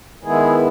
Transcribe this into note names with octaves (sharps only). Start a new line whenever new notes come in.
D#3 G#3 B3 E4 G#4